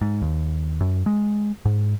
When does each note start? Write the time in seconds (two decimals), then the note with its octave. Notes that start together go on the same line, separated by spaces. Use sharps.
0.01 G#2
0.22 D#2
0.81 F#2
1.06 G#3
1.65 G#2